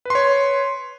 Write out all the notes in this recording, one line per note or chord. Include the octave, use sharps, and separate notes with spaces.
B4 C#5 C6